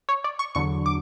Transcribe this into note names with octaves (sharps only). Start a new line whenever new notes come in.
C#5
D5
C#6
E2 D3 F#3 C#6
D6